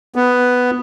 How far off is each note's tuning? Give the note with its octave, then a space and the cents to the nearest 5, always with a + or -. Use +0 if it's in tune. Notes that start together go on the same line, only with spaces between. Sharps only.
B3 +5